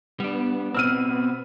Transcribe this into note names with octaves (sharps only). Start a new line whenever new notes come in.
G3 B3 D4
B2 C4 E6 F6 D#7